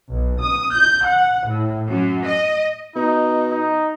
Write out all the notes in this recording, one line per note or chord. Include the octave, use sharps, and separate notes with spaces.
B1
D#6
G6
F#5
A2
F#2
D#5
B2 D#4
D#4